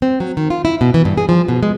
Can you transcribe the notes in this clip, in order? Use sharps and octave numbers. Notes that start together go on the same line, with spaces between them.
C4
F#3
D#3
F4
E4
B2
E3
G2
G#4
F3
B2
G#3